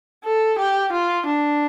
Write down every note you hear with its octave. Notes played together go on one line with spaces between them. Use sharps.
A4
G4
F4
D4